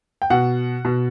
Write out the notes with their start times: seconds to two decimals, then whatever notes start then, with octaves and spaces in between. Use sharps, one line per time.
0.22 G5
0.30 B2 F#5
0.85 B2